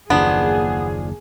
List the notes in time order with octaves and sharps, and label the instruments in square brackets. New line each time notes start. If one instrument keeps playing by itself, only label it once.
[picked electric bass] F#1 D#2 [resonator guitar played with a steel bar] F3 C#4 D4 [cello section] A#3 G#4 [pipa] B3